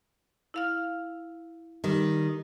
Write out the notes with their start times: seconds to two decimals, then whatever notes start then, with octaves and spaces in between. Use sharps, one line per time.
0.54 E4 F5 F6
1.84 D#3 G3